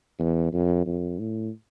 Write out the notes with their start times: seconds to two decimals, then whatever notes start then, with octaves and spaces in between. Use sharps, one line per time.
0.19 E2
0.53 F2
0.86 F2
1.19 A2